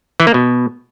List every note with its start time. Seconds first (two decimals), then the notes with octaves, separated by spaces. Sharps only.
0.20 E3
0.27 A#3
0.34 B2